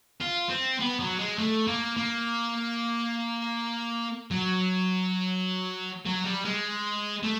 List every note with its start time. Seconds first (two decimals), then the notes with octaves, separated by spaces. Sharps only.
0.21 F4
0.50 C4
0.80 B3
1.00 F#3
1.19 G#3
1.38 A3
1.67 A#3
1.97 A#3
4.31 F#3
6.05 F#3
6.25 G3
6.45 G#3
7.23 A3